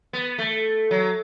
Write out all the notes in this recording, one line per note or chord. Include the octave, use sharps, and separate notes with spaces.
B3
A3
F#3